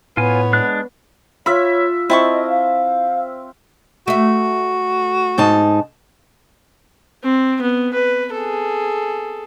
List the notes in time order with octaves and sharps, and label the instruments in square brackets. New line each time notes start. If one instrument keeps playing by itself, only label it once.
[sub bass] A2 [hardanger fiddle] B3 C#5 [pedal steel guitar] F4 G#5
[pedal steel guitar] G#3 D4 F#6
[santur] F4 E5 [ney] C#5 [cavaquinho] B5
[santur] C4 [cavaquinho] E4 A5 C#6 [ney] D#5
[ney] F5
[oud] A3 E5 [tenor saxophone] F#4
[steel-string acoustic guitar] G#2 D#4 A5
[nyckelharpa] C4
B3
B4
G#4 A4